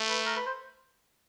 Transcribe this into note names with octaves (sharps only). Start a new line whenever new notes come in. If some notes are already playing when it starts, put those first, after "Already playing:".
Already playing: A3
B4
A#4
B4
C5